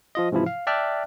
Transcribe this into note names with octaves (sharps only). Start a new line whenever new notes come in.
F3 F4 D#5
G#2 C3 E3 F3 E4
F5
D5 E5 G5 A5 F6 F#6